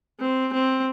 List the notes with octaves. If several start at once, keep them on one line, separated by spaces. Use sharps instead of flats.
C4
C4